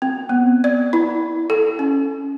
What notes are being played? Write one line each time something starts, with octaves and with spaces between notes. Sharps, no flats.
C4
B3
D5
E4
A4
C#4